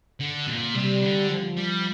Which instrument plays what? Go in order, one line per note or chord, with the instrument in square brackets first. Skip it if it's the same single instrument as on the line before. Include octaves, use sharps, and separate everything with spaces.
[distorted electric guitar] D3
A#2
[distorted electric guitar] C3 [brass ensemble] G3
[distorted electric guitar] D3
[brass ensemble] F3
[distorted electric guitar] G3